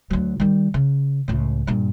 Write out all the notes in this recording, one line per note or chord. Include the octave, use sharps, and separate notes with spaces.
D2 F#3
D#3 G3
C#3
C#2 A2
G2 A#2